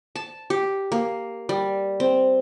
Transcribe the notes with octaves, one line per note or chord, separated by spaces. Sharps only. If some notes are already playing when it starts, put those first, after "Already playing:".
A5
G4
A#3
G3
C4